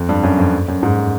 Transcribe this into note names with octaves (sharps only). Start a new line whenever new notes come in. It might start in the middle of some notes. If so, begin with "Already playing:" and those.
Already playing: F2
G2
F#2
F2
F#2
G#2